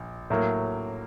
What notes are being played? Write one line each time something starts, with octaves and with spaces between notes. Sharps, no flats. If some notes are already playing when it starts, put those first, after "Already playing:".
Already playing: A#1
A2 F#3 A#3